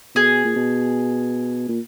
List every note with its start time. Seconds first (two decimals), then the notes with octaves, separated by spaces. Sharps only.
0.15 B2 G#4
0.45 A#2
0.56 B2
1.68 A#2